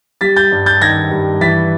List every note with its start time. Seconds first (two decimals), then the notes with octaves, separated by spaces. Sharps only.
0.21 G3 A6 B6
0.36 G6 A6
0.51 G2
0.66 G6 A6
0.81 D#3 G#6 A#6
1.11 G2
1.41 E3 A6 B6